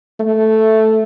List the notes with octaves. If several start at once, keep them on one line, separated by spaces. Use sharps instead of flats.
A3